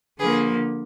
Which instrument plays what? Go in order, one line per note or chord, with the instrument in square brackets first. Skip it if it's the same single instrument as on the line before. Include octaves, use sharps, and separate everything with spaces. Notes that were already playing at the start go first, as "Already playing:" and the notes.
[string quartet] D3 F3 A#3 G#4 B4